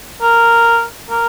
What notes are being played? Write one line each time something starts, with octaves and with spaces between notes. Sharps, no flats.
A#4
A#4